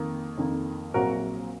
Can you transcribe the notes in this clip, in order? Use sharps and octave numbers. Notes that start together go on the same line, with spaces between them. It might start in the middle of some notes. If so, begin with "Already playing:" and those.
Already playing: F2 D#3 A#3
F2 D#3 A#3
A#1 A#2 F#3 C4 F#4 A#4